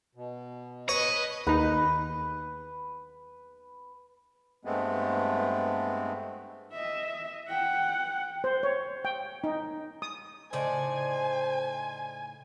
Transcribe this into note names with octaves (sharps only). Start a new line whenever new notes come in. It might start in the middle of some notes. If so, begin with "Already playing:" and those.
B2
B4 C#5 D#5
D#2 D#4 B4
G2 G#3 A3 B3 C4
D#5 E5
F#5 G5
C5
C#5
G5
D#4
D#6
A2 C#3 D#4 C5 D5 G#5